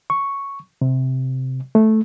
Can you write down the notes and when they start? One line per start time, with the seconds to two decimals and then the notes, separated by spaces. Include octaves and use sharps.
0.10 C#6
0.81 C3
1.75 A3